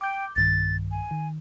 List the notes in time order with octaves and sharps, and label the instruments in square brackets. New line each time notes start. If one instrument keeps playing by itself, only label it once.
[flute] G5 [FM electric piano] D6 G6
[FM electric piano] B1 G2 D#3 [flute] A6
[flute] G#5
[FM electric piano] D#3